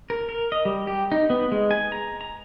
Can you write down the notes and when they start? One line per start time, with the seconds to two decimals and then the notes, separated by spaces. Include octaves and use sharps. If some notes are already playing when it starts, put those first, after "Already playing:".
0.10 A#4
0.29 A#4
0.52 D#5
0.65 G3
0.87 G4
1.12 D#4
1.30 B3
1.52 G#3
1.71 G#5
1.92 A#5
2.21 A#5